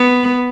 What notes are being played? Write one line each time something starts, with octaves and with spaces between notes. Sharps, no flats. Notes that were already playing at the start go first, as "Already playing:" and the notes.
Already playing: B3